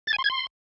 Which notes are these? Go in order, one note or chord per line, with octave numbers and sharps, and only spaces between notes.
A6
G#5
C6
G#6
C6